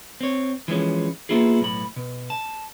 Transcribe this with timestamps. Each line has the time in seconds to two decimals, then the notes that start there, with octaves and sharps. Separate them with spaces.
0.21 C4 C#5
0.68 E3 F3 G#3 C#4
1.29 A#3 B3 D4 E4 F4 G#4
1.60 B1 A2 B5
1.96 B2
2.30 A5